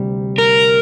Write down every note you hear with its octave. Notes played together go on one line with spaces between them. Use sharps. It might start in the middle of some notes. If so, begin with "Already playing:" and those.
Already playing: D2 C3 G3
A#4